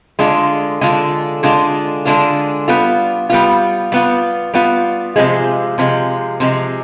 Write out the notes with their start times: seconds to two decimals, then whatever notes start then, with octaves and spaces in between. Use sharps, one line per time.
0.19 D3 G#3 D4 F4
0.81 D3 G#3 D4 F4
1.43 D3 G#3 D4 F4
2.05 D3 G#3 D4 F4
2.68 G3 B3 F4
3.30 G3 B3 F4
3.92 G3 B3 F4
4.54 G3 B3 F4
5.16 C3 F3 G#3
5.78 C3 F3 G#3
6.40 C3 F3 G#3